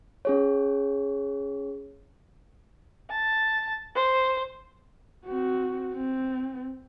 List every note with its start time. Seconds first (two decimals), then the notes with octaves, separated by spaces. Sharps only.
0.25 C#4 G#4 C#5
3.10 A5
3.96 C5
5.26 C4 F#4
5.93 C4